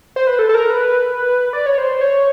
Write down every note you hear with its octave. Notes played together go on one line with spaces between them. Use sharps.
C5
B4
A4
A4
A#4
B4
D5
C#5
C5
C#5